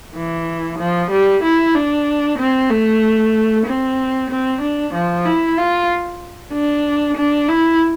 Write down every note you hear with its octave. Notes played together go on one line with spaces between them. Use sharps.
E3
F3
G3
E4
D4
C4
A3
C4
C4
D4
F3
E4
F4
D4
D4
E4